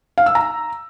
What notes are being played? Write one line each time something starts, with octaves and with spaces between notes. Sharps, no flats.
F5
E6
A#5